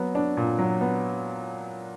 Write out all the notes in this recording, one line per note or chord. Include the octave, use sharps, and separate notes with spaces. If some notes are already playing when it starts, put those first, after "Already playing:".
Already playing: F#3 B3
D4
A#2
F#3
B3